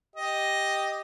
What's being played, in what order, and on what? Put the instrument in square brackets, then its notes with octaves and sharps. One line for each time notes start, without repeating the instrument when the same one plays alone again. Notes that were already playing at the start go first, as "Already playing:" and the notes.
[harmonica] G4 D#5